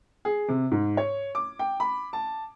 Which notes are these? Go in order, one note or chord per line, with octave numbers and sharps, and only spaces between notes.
G#4
C3
G#2
C#5
D6
G5
B5
A5